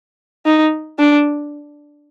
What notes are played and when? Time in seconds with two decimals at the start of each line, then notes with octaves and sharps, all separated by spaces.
0.46 D#4
0.98 D4